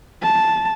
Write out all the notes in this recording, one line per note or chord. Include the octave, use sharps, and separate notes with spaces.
A5